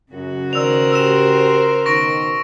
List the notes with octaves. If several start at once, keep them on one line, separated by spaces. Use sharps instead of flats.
F#2 C#3 F#4
D#3 A#4 C5 D5 E6 F7
A2 G4 E6 E7
B2 D#3 C#6 A#6 D7